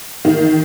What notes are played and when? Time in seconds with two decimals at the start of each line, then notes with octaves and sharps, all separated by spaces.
0.25 D#3